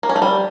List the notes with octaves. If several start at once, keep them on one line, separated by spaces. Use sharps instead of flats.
A#3
C#4
A3
G3